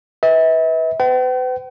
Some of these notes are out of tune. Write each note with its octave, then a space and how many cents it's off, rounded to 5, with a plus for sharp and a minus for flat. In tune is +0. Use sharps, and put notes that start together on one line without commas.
B4 +0 E5 -40
B4 +45 G5 -45